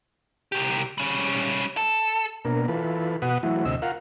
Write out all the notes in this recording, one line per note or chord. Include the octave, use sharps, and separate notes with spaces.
C2 G4
G3 C#4
A4
B2 A#3 D4 A#4
E3 F4 A4 B4
B2 F#4 B4 F#5 D#6
E3 F#3 A3 E4 F#4
D2 C3 D#5 E6
F4 A#4 F5 F#5